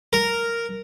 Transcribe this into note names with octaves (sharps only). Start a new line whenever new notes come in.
A#4